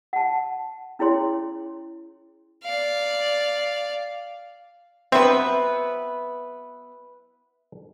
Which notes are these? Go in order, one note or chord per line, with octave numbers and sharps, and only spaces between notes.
F#5 A5
C#4 E4 G#4 C#5 C6
D5 F5
F#3 B3 C4 B4 E5